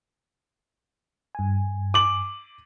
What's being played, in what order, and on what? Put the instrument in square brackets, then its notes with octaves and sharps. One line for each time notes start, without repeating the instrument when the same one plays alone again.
[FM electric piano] G2 G#5
[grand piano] D6 F#7